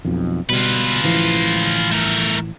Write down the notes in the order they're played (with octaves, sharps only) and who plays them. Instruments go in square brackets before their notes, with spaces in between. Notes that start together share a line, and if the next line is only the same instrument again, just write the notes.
[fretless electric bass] B1 F2
[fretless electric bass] B2 G3 [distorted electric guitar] F4 B4
[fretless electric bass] A1 E3 F3
[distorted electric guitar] A3 A#4